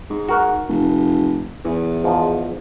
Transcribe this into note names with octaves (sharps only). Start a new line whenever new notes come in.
G#2
F#4 A#4 F#5
F1
E2 E3
G#2 F3